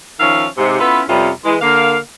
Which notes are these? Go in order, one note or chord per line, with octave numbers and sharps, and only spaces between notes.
D#3 F3 C#4 E5 F5
G#2 C3
B3 C#4 E4 F4 A4 B4
F2 C3 G3 B3 C#4 F4
E3 G#3
D3 A#3 F5